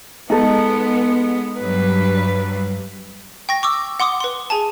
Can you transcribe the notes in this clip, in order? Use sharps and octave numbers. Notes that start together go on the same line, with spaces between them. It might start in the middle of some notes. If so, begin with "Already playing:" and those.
G#3 B3 D#4 A4
G2 F#3 G3 B4
G5 C#6 A#6
C#6 D6 E6
F#5 C6 D6 D#6
B4 C6
G#4 G#5 A5